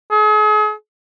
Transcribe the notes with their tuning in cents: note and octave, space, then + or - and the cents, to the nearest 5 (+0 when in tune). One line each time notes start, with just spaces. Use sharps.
G#4 +40